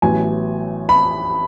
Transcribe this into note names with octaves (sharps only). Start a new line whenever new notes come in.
A1 A2 F#3 B3 G#5
B5